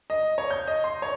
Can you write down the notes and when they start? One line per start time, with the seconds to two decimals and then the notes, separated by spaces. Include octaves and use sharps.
0.10 D#5
0.38 C#5
0.51 G6
0.68 D#5
0.84 C6
1.02 C#5